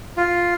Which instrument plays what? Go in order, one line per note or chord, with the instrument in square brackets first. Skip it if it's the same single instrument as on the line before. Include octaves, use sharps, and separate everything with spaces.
[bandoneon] F4